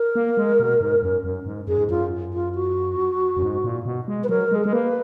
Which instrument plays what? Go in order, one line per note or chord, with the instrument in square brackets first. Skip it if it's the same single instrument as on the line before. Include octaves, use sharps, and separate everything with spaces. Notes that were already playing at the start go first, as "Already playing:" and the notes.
Already playing: [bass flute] A#4
[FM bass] A#3
G#3
B2
G#2
F#2
F#2
G#2
[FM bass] F#2 [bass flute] G#4
[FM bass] G#2
[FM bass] F#2 [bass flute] F4
[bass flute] F4
F#4
[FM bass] F#2
G#2
A#2
B2
G#3
[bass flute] B4
[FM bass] F#3 [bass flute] A#4
[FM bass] G#3 [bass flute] G#4
[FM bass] G#3 [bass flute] A#4
[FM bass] A#3 [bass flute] B4